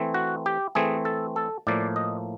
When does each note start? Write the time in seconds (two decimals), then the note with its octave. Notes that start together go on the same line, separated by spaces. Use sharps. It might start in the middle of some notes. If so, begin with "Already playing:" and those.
Already playing: E3 A3 C4
0.14 F#4
0.46 G4
0.75 E3 A3 C4 G#4
1.05 A4
1.36 A4
1.67 A2 F3 A#3 D5
1.96 D#5